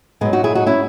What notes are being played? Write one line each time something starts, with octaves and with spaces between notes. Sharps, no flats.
G#2 F#3 G#3 B3
D#4 F#4
E4 G#4
D#4 F#4
C#4 E4